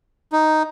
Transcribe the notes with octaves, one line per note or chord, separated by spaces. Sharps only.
D#4